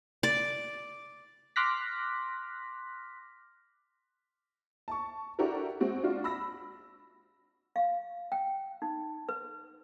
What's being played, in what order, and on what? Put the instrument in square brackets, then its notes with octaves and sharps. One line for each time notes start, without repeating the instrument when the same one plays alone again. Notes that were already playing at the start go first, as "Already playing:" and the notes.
[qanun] D5
[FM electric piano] C6 D6 F6 F#6 A#6 B6
[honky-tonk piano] A5 C#6
D4 E4 F#4 G4 A4 A#4
G#3 C4 F#4
D4 F4 F#4
B5 E6 A#6
[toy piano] F5
G5
D#4
B4